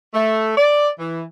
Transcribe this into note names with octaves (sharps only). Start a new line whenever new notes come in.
A3
D5
E3